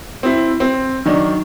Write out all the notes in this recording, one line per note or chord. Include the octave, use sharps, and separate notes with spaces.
C4 E4
C4
D#3 F#3 D4